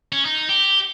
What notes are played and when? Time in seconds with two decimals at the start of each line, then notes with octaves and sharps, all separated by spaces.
0.12 C#4
0.25 D#4
0.49 G4